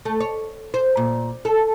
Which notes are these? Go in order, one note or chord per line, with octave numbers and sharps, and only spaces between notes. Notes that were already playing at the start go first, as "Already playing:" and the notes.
A3
C#5
C5
A#2
A4